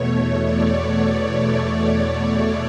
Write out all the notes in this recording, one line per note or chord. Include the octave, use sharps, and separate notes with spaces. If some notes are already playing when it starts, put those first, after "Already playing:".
Already playing: E2 B2 A3 C#5
D5
C#5